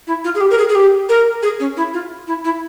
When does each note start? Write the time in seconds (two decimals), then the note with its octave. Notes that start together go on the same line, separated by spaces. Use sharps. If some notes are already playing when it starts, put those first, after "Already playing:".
0.07 E4
0.24 F4
0.35 G#4
0.41 G4
0.51 A#4
0.58 G#4
0.69 G#4
0.75 G4
1.09 A#4
1.43 G#4
1.60 C#4
1.77 E4
1.93 F4
2.27 E4
2.44 E4